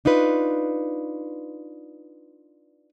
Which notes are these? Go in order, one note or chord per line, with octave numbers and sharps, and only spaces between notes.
D4 D#4 F4 B4